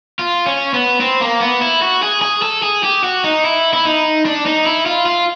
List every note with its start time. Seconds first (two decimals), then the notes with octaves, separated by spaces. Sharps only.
0.19 F4
0.46 C#4
0.74 B3
1.00 C4
1.21 A#3
1.41 B3
1.62 E4
1.82 F#4
2.03 G#4
2.22 G#4
2.42 A4
2.62 G#4
2.83 G4
3.04 F#4
3.24 D#4
3.44 E4
3.74 E4
3.85 D#4
4.26 D4
4.46 D#4
4.65 E4
4.86 F4
5.06 F4